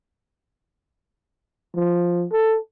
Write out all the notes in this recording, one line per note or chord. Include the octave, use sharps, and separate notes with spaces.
F3
A4